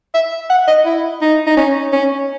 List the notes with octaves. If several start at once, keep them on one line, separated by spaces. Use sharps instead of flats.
E5
F#5
D#5
E4
D#4
D#4
C#4
C#4